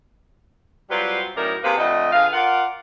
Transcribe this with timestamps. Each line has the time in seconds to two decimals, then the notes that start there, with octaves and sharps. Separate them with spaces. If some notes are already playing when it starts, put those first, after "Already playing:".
0.90 F#3 G3 C4 F4 B4
1.35 F#2 A2 D#4 E4 A#4 D5
1.64 C3 A#3 G#4 A4 B4 C5
1.77 F2 D3 A3 D#5
2.13 D3 F4 G#4 B4 F5
2.33 F4 A#4 D5 F5 F#5